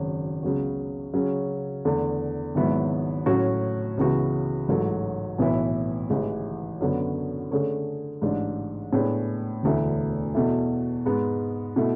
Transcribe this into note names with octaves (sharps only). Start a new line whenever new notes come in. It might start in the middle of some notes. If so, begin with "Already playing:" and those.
Already playing: G#1 F#2 C#3 F#3
C#2 C#3 F#3 B3 F#4
C#3 F#3 C#4
E2 D3 A3
G#1 G#2 F#3 B3 E4
A2 F#3 C#4 F#4
C#2 C#3 E3 B3 F#4
A1 G#2 F#3 A3
B1 A2 E3 B3 E4
A1 G#2 E3 G#3
F#2 D3 F#3 B3
D3 A3 C#4 G#4 C#5
A1 G#2 G#3 D4
A2 G#3 B3 D4 G#4
E1 D2 D3 A3 E4
E2 B2 A3 E4
G#2 G#3 B3
B2 A3 E4